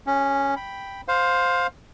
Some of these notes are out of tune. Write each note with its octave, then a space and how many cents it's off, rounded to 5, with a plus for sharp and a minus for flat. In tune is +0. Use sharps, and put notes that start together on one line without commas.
C#4 +0 G#4 -45
G5 +0 B5 +0
C5 +0 F5 +20